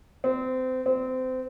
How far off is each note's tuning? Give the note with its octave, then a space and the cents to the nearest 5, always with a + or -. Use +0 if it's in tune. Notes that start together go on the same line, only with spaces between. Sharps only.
C4 -25
C4 -25